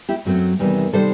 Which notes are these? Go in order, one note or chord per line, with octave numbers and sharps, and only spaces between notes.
E4 G4
F#2 F#3 A3 C4
E2 C3 D#3 G3
C3 D#3 G3 A4 C5